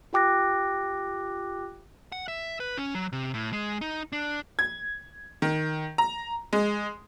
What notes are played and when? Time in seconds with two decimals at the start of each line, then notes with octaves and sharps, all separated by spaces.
0.13 F4 G4 G5 D6 F#6 A#6
2.12 F#5
2.28 E5
2.60 B4
2.77 C#4
2.95 F#3
3.13 C3
3.34 A2
3.53 G#3
3.81 D#4
4.12 D4
4.59 G#6
5.42 D#3
5.98 A#5
6.53 G#3